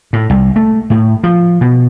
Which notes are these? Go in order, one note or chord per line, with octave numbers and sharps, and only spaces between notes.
A2
C2
A3
A2
F3
B2